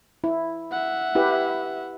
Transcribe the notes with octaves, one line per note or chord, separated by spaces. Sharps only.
E4
E5 F#5
E4 G4 B4